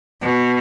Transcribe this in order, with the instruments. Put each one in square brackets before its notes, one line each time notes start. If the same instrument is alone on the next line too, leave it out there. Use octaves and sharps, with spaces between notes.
[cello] B2